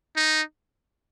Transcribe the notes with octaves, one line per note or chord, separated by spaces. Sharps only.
D#4